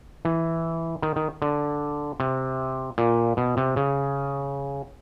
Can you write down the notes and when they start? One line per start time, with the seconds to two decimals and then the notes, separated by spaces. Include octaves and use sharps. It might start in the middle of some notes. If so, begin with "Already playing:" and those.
0.25 E3
1.02 D#3
1.16 D#3
1.42 D3
2.20 C3
2.98 A#2
3.37 B2
3.57 C3
3.76 C#3